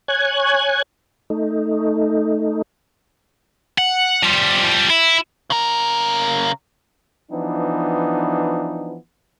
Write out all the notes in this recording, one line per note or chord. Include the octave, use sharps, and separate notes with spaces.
C#5 G#5 F#6 G#6
A3 D#4
F#5
F3 G3
E4
C#3 A#4
E3 F3 B3 D4 D#4